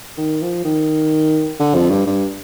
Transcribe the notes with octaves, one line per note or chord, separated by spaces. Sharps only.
D#3
F3
D#3
D3
F2
G2
G2